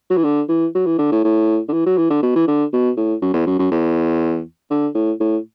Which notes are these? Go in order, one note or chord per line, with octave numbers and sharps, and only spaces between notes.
F#3
E3
D3
E3
F#3
E3
D3
A2
A2
D3
E3
F#3
E3
D3
B2
E3
D3
B2
A2
F#2
E2
F#2
F#2
E2
D3
A2
A2